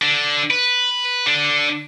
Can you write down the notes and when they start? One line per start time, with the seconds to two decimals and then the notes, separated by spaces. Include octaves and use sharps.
0.02 D3
0.50 B4
1.26 D3 D4